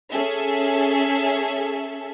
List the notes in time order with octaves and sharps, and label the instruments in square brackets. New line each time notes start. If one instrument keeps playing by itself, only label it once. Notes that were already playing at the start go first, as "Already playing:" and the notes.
[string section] C#4 G#4 A4 E5